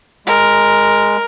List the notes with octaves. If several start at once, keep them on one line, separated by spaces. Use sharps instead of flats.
G#3 A#4